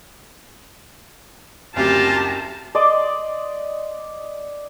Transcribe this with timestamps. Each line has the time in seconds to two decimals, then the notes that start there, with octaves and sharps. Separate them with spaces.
1.76 F#1 D2 C4 F4 G4 A5 A#5
2.75 D5 D#5 C6 D6